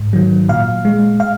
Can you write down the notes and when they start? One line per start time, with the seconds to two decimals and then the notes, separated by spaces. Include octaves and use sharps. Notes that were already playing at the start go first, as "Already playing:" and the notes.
Already playing: G#2
0.13 D#3 F#3
0.49 A#2 F5
0.85 G#3
1.20 F5